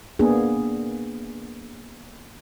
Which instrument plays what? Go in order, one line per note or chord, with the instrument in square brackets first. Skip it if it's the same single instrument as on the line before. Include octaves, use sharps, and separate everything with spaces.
[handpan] A#3 B3 D4 G#4